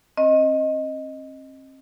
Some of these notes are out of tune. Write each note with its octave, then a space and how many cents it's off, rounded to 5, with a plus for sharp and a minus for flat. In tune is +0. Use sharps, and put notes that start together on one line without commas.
C4 +40 D#5 +0